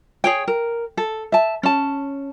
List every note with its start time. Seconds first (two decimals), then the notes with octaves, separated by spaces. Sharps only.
0.24 G#4 C#5 G5
0.48 A#4
0.97 A4
1.32 E5 A5
1.63 C#4 A5